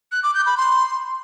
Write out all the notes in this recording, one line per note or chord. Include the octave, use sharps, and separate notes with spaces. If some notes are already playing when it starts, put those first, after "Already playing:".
F#6
D6
G6
B5
C6